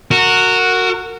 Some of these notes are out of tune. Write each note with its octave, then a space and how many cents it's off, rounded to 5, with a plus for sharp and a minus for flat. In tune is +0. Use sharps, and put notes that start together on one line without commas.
F#4 -5 A#4 -25